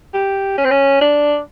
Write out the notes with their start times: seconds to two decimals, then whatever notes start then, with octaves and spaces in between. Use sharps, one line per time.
0.14 G4
0.58 C#4
0.65 C4
0.71 C#4
1.01 D4